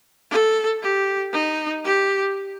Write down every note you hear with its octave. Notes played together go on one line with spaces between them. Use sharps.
A4
G4
D#4
G4